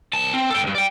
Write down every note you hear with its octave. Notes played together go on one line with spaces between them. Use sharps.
C2 A5
C4
A4 G5
C#2 G2
D5 G5